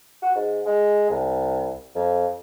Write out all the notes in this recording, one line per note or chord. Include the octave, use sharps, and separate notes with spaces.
F#4
G#2
G#3
C2
F2